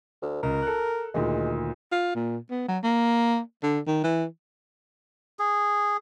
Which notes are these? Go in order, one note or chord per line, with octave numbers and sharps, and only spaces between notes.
D2
C#2 A#4
A4 F#6
D2 A#2 D#3 G#3
F4
A#2
B3
F#3
A#3
D3
D#3
E3
G#4